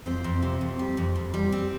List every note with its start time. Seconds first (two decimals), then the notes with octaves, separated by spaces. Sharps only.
0.06 F2 C4 C5
0.24 F2
0.42 C3
0.61 F2
0.79 G3
0.97 F2
1.16 F2
1.34 G3
1.52 C4